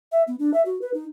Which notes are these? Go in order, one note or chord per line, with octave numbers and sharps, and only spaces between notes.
E5
B3
D4
E5
F#4
B4
D#4